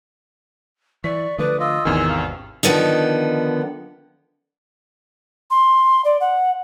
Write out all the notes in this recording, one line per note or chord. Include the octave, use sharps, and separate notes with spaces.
E3 D5 C#6 B6
D3 F3 A3 B4 D5 D#6
F4 D#5 E6
G#1 E2 C3 D#3 C#4 G#5 F6
F5
D3 D#3 F3 B3 D#4
C6
D5
F#5